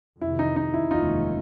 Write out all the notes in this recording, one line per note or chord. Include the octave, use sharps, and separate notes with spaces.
F2 C3 D#3 E4
D#4
D#4
E4
F1 D#2 D#3 G#3 C#4 D#4 F4